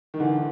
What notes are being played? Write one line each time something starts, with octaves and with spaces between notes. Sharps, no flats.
D#3
D3 E3